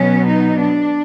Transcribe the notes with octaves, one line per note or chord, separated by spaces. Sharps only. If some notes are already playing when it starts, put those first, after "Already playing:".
Already playing: B2 F#3 B3 C#4
D#4
D4